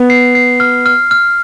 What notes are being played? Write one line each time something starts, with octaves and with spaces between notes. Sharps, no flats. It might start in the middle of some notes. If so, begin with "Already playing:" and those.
Already playing: B3
C7
C7
F6
F6
F6